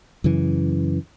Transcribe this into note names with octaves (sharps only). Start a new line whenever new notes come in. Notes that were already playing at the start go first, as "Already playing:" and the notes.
F#2 C#3 E3